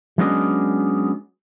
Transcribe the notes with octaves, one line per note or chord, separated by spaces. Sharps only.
F#3 G#3 B3 C#4 D4 D#5